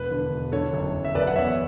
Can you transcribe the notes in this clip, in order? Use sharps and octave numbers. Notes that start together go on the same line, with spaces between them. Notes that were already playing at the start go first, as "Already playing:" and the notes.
Already playing: E1 B4
D3
E1
D3 A4 C#5
F#1
F#1
E5
F#1 B4 D5
F#5
E2 C#5 E5